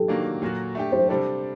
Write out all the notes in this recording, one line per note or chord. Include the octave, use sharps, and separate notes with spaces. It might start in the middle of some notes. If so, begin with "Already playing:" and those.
Already playing: G4 A4
D#3 F#3 A#3 D4
A#2 F#3 A#3 F#4
A3 D4 G4
C5
C3 G3 D4 A4 C5